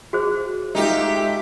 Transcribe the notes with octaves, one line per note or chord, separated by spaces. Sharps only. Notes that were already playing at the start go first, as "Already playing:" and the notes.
F#4 G#4 C5
G#3 A3 D#4 F4 G4 E5